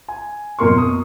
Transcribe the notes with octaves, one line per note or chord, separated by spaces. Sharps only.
G#5
F#2 B2 A#3 A#4 C6 C#6
D#6